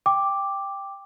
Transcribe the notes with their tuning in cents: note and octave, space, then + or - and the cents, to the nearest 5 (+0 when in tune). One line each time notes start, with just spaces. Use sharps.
G5 +10 D6 +0